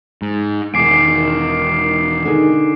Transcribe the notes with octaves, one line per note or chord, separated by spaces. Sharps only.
G#2
E1 E2 D#3 G#5 D6 C7 D7
D3 D#3 G#4